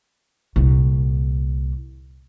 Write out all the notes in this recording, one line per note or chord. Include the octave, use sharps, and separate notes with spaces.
C2 A#2